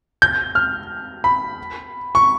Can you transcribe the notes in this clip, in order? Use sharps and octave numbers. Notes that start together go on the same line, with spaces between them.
G6
F6
B5
C#6